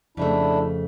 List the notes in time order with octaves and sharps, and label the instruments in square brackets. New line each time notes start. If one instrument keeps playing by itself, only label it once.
[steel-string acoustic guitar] F2 C#3 A3 [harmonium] D4 E4